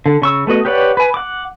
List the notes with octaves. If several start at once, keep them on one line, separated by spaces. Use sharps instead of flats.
D3
C#3 C#6 E6
A3 B3 F#4 D#5
G4 B4 C#5 D5 F#5
B4 G#5
F#5 D6